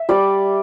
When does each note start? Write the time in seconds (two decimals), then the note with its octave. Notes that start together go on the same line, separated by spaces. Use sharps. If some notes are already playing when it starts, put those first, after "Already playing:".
Already playing: E5
0.09 G3 D5